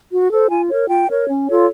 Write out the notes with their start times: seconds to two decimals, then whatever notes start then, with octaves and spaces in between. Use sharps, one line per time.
0.11 F#4
0.31 A4 C5
0.49 F4 G#5
0.69 A#4 C#5
0.88 F4 G5
1.09 A#4 C#5
1.27 C#4
1.47 F4 A4 C#5